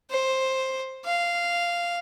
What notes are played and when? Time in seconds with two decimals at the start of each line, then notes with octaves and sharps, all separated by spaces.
0.11 C5
1.05 F5